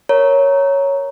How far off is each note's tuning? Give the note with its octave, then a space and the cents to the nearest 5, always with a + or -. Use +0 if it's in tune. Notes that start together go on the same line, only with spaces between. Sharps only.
A#4 +0 C#5 +0 A#5 +0